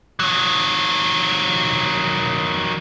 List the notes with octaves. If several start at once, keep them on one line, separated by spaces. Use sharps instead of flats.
D#3 F#3